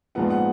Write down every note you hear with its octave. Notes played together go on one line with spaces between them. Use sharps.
A#1 G#2 F3 B3 F#5
F#5